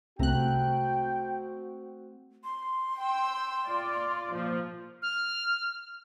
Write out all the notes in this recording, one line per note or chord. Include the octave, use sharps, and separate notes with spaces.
C2 C3 A3 C4 F#4 G5 A#5 F#6
C6
G5 E6
F4 D5
A#2 F3
F6